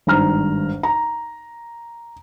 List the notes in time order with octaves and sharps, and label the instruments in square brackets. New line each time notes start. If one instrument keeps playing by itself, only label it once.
[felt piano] G#1 G2 A#5 F6
A#5